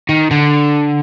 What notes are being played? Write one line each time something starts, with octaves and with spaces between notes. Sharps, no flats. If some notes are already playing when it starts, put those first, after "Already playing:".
D#3
D3